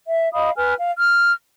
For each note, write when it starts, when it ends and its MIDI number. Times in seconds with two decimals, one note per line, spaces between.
0.08 0.32 76
0.33 0.50 75
0.33 0.50 77
0.33 0.50 83
0.33 0.50 87
0.55 0.74 71
0.55 0.74 80
0.55 0.74 89
0.77 0.91 77
0.97 1.33 89